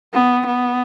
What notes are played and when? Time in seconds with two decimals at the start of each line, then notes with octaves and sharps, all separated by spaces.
0.14 B3
0.47 B3